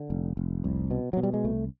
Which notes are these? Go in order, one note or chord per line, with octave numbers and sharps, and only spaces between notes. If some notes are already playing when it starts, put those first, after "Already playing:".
Already playing: D3
F1
F1
C2
B2
B2 F#3
G3
G#3
C2 A3